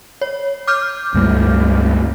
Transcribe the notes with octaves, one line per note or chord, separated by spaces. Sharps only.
C#5
D6 F6 G6
C#2 G2 A3